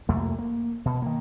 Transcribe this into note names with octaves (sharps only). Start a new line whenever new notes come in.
C2 F2 A3 A#3
A#3
B2
D#3 A#3